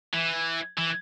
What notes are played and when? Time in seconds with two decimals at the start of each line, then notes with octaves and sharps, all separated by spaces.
0.14 E3
0.78 E3